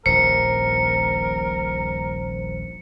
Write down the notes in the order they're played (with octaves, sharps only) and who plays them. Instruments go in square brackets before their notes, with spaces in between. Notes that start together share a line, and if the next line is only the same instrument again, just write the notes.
[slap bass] D#1 A#1 [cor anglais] A#4 [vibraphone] C5 [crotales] C#7